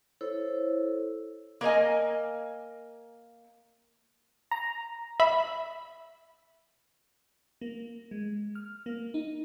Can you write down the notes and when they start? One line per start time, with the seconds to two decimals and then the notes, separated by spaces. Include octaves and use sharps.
0.21 E4 A4 C5 C#5
1.61 A#3 A#4 D#5 G#5
4.51 A#5
5.20 E5 B5
7.61 A#3
8.11 G#3
8.55 F6
8.86 A#3
9.14 D#4